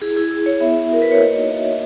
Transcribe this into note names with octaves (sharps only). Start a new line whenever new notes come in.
E4 G#4
E4 G#4
E4
E4 C#5
B3 E5
B3
F#4 A#4
F#4 B4
C#5
A#3 D#5
D#4
F#4 E5
A#3